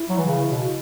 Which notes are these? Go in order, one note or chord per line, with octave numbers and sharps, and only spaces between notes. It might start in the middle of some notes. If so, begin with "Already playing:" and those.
Already playing: E4
F#3
E3
C#3
B2